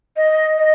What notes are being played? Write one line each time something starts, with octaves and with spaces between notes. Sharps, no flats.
D#5
D#5